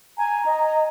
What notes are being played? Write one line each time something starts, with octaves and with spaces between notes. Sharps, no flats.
G#5 A#5
D#5